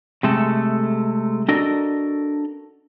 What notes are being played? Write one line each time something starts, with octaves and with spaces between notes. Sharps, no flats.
C3 G#3 A3 A4
D4 F#4 A4 A#4 D5 D#5